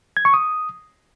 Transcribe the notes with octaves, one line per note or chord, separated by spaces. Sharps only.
G#6
C#6
D#6